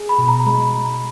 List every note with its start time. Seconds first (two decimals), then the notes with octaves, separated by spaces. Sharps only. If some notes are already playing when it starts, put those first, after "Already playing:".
Already playing: G#4
0.09 B5
0.18 B2
0.28 A#5
0.46 G#3 B5